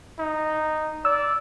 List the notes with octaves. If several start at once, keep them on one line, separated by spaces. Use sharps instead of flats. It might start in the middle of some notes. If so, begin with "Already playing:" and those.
D#4
D5 E6